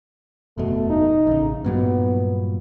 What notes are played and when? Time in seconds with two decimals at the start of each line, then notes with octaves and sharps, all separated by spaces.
0.58 F#1 E2 B2 A3
0.90 D#4
1.27 A1 C#3
1.64 G2 A#2 F#3 B3